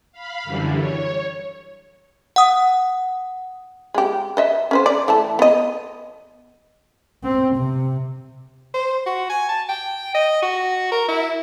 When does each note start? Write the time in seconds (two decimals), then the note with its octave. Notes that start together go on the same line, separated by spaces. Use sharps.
0.12 F5 B5
0.44 F#2 D3 E3 G3
0.77 C#5
2.36 F#5 D#6
3.94 G#3 G4
4.37 B4 D#5 E5
4.71 C#4 B4 C5
4.86 D5
5.08 E3 A3 A5
5.39 B3 D#5
7.24 C4
7.56 C3
8.74 C5
9.06 F#4
9.30 G#5
9.49 A5
9.69 G5
10.14 D#5
10.42 F#4
10.92 A#4
11.08 E4